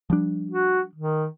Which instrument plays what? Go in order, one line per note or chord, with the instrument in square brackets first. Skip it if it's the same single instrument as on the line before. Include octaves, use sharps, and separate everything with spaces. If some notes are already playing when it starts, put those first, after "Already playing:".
[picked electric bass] F3 G3 D4
[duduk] F#4
D#3